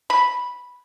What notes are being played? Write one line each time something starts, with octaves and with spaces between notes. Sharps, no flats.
B5